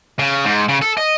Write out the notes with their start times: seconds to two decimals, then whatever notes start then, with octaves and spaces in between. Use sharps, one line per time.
0.19 C#3
0.45 G#2
0.69 C#3
0.82 A4
0.98 D#5